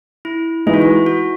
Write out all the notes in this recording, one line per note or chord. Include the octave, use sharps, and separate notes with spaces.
E4
E3 G#3 D#4 E4
F#4
E4
F#4